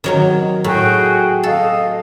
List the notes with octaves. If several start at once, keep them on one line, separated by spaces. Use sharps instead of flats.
D#3 F#3 A#4
A2 F#4 G#4 G5
A4 D#5 F5